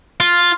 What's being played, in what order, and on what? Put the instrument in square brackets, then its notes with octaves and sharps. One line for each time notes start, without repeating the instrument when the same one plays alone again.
[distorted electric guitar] F4